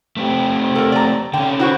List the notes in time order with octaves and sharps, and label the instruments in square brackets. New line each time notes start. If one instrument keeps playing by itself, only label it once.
[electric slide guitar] A3 C4 G4
[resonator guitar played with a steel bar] A4 A#4
D5 A#5
[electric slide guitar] D3 C#4 [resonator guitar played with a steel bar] G5
[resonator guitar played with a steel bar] E4 F#4 C5